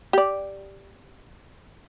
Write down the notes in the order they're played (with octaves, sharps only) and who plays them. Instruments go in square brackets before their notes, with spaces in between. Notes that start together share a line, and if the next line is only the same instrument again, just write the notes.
[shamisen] G4 D5